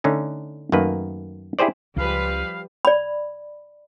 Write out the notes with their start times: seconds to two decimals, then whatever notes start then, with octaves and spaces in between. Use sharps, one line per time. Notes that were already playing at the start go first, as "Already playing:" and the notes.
0.04 D3 A3 C#4 D#4
0.72 F#2 D#3 A3 A#3 B4
1.59 E4 G4 G#4 C5 D5
1.97 C#2 C#3 F3 G3 B4 F5
2.85 D5 B5